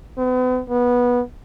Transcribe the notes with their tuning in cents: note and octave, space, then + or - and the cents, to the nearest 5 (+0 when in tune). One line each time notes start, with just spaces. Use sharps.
B3 +40
B3 -15